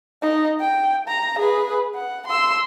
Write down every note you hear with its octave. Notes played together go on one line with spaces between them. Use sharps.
D#4
G5
A#5
G#4 B4
F#5
C6 E6